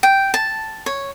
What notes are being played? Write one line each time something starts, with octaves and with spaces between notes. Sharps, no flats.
G5
A5
C#5